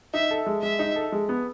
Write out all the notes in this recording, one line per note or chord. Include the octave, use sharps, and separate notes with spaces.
D#4 E5
A4
G#3
G#3 E5
D#4
A4
G#3
B3